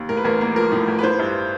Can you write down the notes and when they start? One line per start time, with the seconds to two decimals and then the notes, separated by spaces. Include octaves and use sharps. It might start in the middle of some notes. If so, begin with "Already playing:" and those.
Already playing: D#2
0.09 A2 A#4
0.17 B4
0.25 A1 A#4
0.41 A#3
0.56 F3 A#4
0.72 A2
0.88 A1
0.99 B4
1.03 E3 C5
1.19 G2